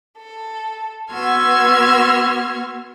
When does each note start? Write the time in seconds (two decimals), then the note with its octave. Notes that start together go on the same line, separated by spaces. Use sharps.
0.17 A4
1.12 B3 F#4 C6 E6 F6 G#6